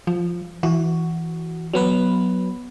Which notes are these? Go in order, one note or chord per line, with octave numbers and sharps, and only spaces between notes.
F3
E3 F#4
F#3 B3 B4